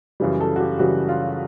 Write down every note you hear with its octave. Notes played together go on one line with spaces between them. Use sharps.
F#2 C#3 E3 G3
A4
F#4
G4
F#2 C#3 E3 G3 F#4
F4